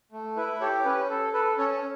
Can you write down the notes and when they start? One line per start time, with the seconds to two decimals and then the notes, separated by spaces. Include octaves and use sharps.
0.12 A3
0.36 E4 B4
0.61 G4 A4 C#5
0.85 C#4 B4
1.09 A4
1.33 A4 B4
1.58 C#4 A4 C#5